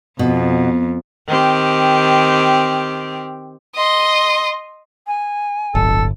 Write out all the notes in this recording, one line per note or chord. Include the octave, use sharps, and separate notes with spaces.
F2 B2
D#3 C4 G4
D#5 C6
G#5
D1 G1 A4